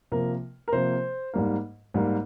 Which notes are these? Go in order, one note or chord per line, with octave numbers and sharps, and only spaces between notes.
C3 F3 A#3 A#4
A#4
C3 F3 A#3 C5
G#2 G3 A#3
G#2 G3 A#3